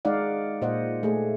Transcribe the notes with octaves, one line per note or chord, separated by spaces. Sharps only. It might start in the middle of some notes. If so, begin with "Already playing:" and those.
G#3 D#4 D5 F5 F#5
A#2 C5 D#5 F#5
A3 G#4